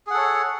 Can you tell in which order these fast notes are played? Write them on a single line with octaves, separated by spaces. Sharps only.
G#4 F#5 A4 C#5